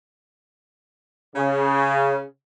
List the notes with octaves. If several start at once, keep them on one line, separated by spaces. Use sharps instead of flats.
C#3